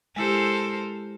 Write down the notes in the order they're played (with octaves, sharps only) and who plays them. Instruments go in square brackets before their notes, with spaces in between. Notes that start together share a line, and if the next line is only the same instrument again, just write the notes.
[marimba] G#3 E4 G4 [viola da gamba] A4 A#4 C5